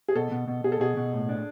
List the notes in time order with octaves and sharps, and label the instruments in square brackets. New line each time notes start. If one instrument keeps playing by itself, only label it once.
[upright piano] G#4
[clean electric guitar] B2 [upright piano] A4
[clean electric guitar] B2
B2
[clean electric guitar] B2 [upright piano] G#4
[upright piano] A4
[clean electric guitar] B2 [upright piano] G#4
[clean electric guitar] B2
A2
D4